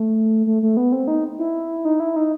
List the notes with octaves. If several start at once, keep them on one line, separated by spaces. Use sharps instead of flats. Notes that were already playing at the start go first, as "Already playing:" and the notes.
Already playing: A3
A3
A3
B3
C4
D#4
E4
D#4
E4
D#4